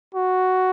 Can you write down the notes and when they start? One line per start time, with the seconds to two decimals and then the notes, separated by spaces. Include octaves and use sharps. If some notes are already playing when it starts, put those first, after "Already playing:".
0.15 F#4